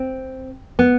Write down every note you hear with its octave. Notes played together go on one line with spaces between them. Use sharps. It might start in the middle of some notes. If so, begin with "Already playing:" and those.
Already playing: C4
B3